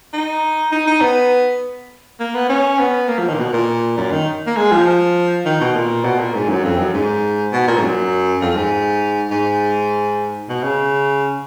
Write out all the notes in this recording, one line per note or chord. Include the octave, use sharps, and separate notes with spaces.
D#4
D#4
D#4
B3
A#3
B3
C#4
B3
A#3
F3
D#3
A#2
B2
A#2
F#2
D#3
A#3
G#3
F3
D#3
B2
A#2
B2
A#2
G#2
F#2
F2
F#2
G#2
B2
A#2
G#2
F#2
F2
G#2
G#2
B2
C#3